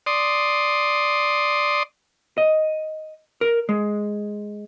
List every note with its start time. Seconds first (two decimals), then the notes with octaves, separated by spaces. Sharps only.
0.06 D5 C6 D#6
2.38 D#5
3.41 A#4
3.69 G#3